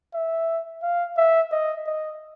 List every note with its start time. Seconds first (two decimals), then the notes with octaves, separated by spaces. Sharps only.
0.13 E5
0.82 F5
1.17 E5
1.52 D#5
1.86 D#5